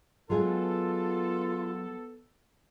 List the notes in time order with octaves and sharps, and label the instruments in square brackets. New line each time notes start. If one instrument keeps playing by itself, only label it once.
[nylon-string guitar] F#3 G#3 G#4 [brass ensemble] B3 A4 [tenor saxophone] F4